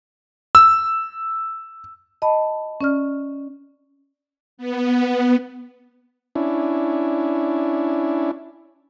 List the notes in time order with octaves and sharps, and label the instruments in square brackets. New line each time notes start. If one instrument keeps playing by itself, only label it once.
[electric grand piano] E6
[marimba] D#5 A5 B5
C#4 D5 F6
[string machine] B3
[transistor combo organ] C#4 D4 E4